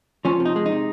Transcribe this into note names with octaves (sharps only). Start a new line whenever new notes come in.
F3 C#4
C3
D#4
G#3
D#4
C3